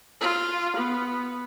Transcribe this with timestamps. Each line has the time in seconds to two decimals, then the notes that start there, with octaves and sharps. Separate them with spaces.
0.21 F4
0.76 B3